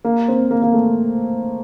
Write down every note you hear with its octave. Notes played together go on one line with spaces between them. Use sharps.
A#3
C4
A#3
A#3
A3